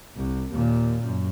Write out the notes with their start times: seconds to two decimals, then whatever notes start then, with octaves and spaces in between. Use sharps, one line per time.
0.16 C2
0.51 D#2 A#2
1.01 F#2